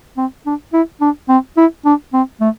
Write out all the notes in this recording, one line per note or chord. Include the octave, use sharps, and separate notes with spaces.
C4
D4
E4
D4
C4
E4
D4
C4
A3